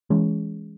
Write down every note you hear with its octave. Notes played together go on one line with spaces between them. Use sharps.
E3 G#3 C#4